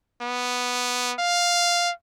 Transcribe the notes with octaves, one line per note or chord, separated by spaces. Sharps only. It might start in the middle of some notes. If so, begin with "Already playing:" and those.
B3
F5